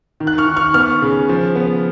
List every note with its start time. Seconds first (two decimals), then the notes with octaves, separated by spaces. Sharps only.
0.20 D#3
0.27 F#6
0.38 C#6 F6
0.48 D#3
0.57 C#6 F6
0.74 B3 C#6 F6
1.02 C#3
1.29 F3
1.56 B3